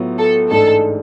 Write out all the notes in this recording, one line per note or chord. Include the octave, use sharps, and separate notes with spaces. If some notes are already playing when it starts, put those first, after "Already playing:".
Already playing: A2 F#3 B3 F4
A4
A1 G#2 G#3 D4 A4